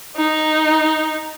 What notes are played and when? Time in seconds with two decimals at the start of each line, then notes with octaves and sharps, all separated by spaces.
0.16 D#4